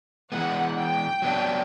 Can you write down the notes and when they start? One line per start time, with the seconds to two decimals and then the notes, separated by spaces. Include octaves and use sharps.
0.32 E3 G#3 B3 F#5
0.77 G5
1.22 F#3 B3 D4